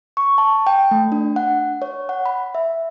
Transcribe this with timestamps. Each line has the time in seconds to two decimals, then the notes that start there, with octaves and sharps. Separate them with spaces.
0.17 C#6
0.38 A5
0.67 G5
0.91 A3
1.12 D4
1.36 F#5
1.82 C#5
2.09 F#5
2.26 B5
2.55 E5